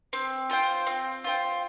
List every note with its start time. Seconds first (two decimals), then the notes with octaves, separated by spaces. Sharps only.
0.13 C4
0.50 F4 C5 G5
0.87 C4
1.24 F4 C5 G5